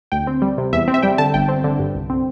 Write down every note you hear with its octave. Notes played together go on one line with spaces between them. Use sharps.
D2 G5
C4
G3
C3
E2 E5
C4
E5
G3 G5
D3 A5
G1 G5
C4
D3
G2
C2
C4